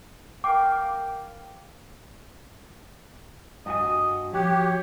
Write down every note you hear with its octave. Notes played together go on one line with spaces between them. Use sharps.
A#4 F5 G5 D6
G2 F#4 D#5 G#5
F3 F#4 G4 C#5